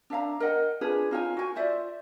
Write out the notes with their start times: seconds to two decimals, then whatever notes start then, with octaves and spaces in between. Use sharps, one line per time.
0.10 D4 E5 F5 A#5
0.40 A#4 D#5 F#5 G5
0.81 D4 F4 G#4 B4
1.11 D#4 F4 C#5 G#5
1.37 F#4 G#5
1.55 F4 C5 D5 E5